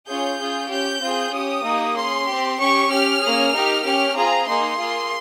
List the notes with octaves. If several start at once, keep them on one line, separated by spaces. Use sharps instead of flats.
C#4 F4 G#4 G6
C#4 F4 G#4
C#4 G4 G6
C4 F4 G#4
C#4 G4 D#6
A#3 D#4 G4
C#4 G#4 C6
C4 G4
C#4 G4 C#6
C#4 G4 F6
A#3 C#4 G#4
A#3 D#4 G4
C#4 G4 F6
C4 F4 G#4 A#5
A#3 D#4 G#4 C6
A#3 F4 G#4